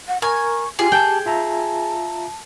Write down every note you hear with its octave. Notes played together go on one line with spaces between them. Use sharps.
F#5
A#4 G#5 A#5 C#6
F4 G4 G#4
G5 A5
F4 E5 A5 A#5